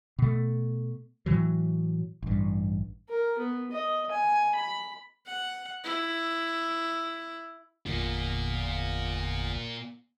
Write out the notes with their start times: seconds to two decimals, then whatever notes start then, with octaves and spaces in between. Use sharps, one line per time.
0.19 B2 A3
1.26 A2 E3 F#3
2.22 A1 G2
3.09 A#4
3.39 B3
3.71 D#5
4.11 G#5
4.55 B5
5.26 F#5
5.84 E4
7.86 G1 E2 A#3 F4